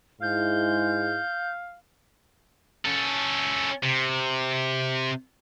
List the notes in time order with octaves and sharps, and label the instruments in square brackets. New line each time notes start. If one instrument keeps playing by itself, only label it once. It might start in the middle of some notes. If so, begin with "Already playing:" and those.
[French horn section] G#2 G#3 E4 [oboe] F5 [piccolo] G6
[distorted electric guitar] C#4 A4
C3